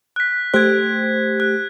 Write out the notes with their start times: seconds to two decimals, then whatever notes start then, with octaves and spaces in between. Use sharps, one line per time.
0.16 F#6 B6
0.54 A3 G4 C5 F#6 G#6
1.40 F#6